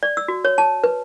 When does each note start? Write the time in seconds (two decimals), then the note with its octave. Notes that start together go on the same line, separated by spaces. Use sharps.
0.03 D5
0.17 E6
0.28 F#4
0.45 C#5
0.58 A5
0.84 B4